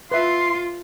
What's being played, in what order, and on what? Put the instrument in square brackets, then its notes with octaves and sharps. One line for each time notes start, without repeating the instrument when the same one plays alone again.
[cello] F4 [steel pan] B4 E5 [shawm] C6